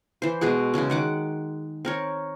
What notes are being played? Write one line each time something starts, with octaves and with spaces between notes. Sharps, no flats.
E3 C5
B2 G#3 F#4 G#4
C#3 E3 G#3 C#4
D#3 F#5 D6
C4 A#4 C#5